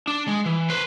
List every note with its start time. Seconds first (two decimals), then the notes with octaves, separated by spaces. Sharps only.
0.07 D4
0.28 G#3
0.46 E3
0.70 B4 C5